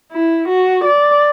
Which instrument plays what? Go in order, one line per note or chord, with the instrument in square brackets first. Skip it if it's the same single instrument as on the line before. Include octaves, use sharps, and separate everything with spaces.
[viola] E4
F#4
D5